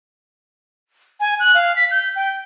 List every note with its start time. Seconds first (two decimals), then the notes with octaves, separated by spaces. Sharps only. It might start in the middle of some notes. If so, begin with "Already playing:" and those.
1.20 G#5
1.39 F#6
1.55 F5
1.76 B6
1.91 G6
2.16 G5